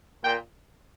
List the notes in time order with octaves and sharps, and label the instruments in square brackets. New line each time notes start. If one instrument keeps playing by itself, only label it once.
[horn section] A#2 G5